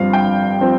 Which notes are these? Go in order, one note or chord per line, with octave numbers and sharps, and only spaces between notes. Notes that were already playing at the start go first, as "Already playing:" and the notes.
Already playing: G1 G2 F3 C4 F5
G5
F3 C4